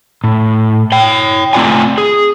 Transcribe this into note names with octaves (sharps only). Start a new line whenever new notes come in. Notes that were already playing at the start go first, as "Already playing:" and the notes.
A2
C#5 G5
A3 C4 F4 D5 G#5
G#4